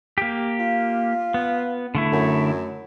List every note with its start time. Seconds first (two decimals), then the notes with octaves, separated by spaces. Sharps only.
0.18 A#3 G4
0.59 F4
1.34 B3
1.95 D3 A3 E4
2.13 F#2